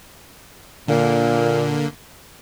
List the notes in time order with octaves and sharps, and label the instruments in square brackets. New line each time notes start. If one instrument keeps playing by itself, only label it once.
[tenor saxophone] A#2 [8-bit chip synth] D3 A#3